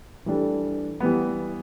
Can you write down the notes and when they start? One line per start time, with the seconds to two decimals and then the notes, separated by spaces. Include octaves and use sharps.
0.26 E3 G3 D4 A4
1.00 E3 G3 B3